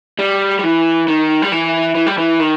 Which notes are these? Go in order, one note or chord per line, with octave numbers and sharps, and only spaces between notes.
G3
G3
E3
D#3
G3
E3
E3
G3
E3
D#3